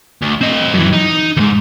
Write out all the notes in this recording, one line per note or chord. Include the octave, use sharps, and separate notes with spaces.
D2
C4 D#5
F#2 E3
D#4
D#2 G#2